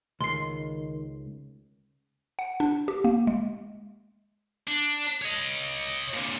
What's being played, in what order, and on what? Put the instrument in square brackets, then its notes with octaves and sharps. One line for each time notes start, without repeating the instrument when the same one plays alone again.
[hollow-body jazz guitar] C#2 [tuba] D#3 [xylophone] C6 C7
[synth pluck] F#5
D4
G4
A#3
G#3
[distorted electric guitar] D4
C#5 D#5
A#2 D3